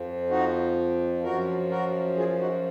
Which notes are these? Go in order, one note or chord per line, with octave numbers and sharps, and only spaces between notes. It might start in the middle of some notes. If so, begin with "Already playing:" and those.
Already playing: F2 F3
D#4 F#4
F#2 F3 F#4 A#4
F#4 A#4
F4 G#4
D#4 F#4